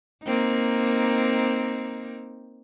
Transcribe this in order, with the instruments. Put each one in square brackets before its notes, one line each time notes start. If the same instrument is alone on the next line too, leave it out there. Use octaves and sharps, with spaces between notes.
[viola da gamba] A#3 C4 D#4